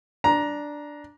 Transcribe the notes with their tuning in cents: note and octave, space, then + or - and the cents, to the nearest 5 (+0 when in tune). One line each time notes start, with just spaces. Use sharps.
D4 +0 A#5 +15